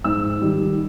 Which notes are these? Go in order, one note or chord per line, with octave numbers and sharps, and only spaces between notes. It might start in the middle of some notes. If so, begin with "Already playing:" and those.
G#2 E6
D#3 G3